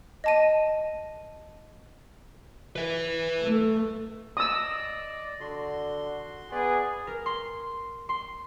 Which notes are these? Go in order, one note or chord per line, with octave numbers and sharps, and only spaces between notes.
D#5 A5 D#7
B4 E5
A3
D5 D#5 D#6 E6
D3 F#4 C6
B3 G#4 B4 D5
A#4
C6
C6